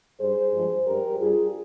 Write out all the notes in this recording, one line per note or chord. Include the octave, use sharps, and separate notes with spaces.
G2 G3 G#4 C5
G2 F3 G#3
G2 G3 G4 A#4
G2 G3 F4 G#4